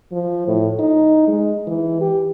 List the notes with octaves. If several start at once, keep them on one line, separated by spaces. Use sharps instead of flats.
F3
A2
D#4
G#3
E3
G4